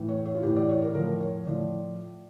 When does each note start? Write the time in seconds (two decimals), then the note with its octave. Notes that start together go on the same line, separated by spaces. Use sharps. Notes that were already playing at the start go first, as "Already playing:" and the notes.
Already playing: A2 E3
0.09 C#5
0.25 C#5
0.35 F4
0.43 A2 E3 G4
0.56 D5
0.69 C#5
0.82 A#4
0.95 A2 F3 A#4
1.21 C#5
1.46 A2 F3 D5